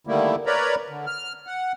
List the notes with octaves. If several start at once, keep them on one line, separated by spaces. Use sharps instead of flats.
D3 D#3 G3 A3 A#3 E4
A#4 B4 C#5 D5 A#5 B5
D3
F6
F#5